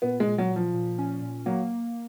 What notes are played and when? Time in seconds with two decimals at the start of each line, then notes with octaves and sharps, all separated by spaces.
0.02 A#2 B3
0.20 G#3
0.27 A#2
0.38 F#3
0.50 A#2
0.56 F3
0.74 A#2
0.98 C#4
1.21 A#2
1.46 F#3 A#3